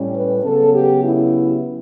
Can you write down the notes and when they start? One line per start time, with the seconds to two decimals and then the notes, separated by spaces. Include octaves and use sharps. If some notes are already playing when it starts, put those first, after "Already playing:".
Already playing: A2 G3 C#4
0.15 B4
0.43 C#3 F#3 B3 A4
0.73 G4
1.04 E4